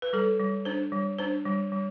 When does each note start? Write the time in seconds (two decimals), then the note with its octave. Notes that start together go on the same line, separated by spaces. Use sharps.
0.02 B4
0.13 G3 A4
0.40 G3
0.65 D4 C5
0.92 G3
1.18 D4 C5
1.46 G3
1.72 G3